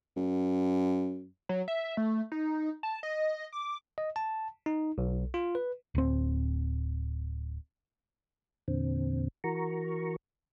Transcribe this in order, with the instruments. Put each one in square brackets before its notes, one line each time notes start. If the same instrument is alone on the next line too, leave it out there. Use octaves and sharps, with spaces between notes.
[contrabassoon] F#2
[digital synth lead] F#3
E5
A3
D#4
A5
D#5
D6
[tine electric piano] D#5
A5
D#4
B1
F4
B4
[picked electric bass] D1 C4
[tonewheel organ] E2 A#2 D3 C4
E3 F#4 A#4 A#5 C#6